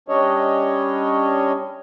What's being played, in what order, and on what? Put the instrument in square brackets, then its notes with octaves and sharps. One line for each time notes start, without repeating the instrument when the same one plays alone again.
[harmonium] G3 C#4 D4 C#5 D#5